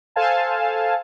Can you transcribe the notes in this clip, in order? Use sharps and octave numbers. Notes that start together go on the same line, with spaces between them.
A4 C5 F5 G#5 A5